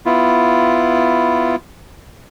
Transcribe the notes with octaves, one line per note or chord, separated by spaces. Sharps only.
B3 E4 F4